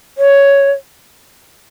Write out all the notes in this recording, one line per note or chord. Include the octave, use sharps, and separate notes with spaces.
C#5